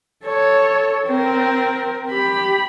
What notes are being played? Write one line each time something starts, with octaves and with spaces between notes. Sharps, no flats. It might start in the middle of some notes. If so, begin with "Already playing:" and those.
A4 C#5
C4 A#4
G4 B5